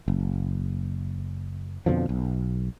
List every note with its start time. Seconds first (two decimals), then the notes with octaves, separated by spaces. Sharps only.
0.08 F#1
1.86 F2 B2 D3 F3
2.09 B1